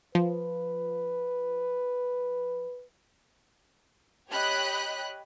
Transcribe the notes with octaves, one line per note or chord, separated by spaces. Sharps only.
F3 B4
G4 C#5 D#5 G5 B5 F#6